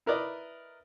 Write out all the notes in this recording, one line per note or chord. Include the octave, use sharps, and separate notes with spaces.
E4 A#4 B4 D5 D#5